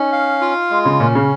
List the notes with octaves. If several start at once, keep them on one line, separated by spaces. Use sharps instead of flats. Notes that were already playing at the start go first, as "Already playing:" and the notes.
Already playing: C#4 D#4
F5
F4
G#3
C#3
A#2 C#4
C#3